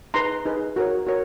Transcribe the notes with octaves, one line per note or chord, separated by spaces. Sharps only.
D#4 G#4 B4 A#5 C6
D#4 G#4 B4
F#4 A#4 C#5
F#4 A#4 C#5